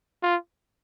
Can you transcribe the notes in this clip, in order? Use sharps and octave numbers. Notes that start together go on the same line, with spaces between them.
F4